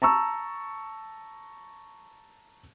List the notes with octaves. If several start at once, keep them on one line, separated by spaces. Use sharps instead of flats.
A5 A#5 C#6 E6